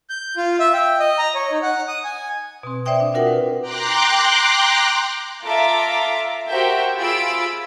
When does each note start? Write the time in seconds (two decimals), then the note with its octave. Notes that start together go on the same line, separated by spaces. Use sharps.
0.10 G6
0.37 F4
0.60 E5
0.73 G5
1.00 D#5
1.18 A#5
1.35 C#5
1.51 D#4
1.63 F#5
1.88 D#6
2.04 G#5
2.63 B2 C4
2.86 C5 D5 E5 G5 D#6
3.00 D4
3.14 D4 F4 F#4 A#4 F#5 G5
3.27 F4 B4
3.61 G5 A#5 C6 D6 F#6
5.45 F4 A4 E5 F5 A#5 D6
6.48 F#4 G4 A#4 C5 E5 G5
6.96 F4 G#4 B5 E6 D7